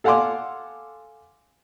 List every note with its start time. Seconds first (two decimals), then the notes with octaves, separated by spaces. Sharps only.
0.04 A4 F5 F#5 G#5 C6 D6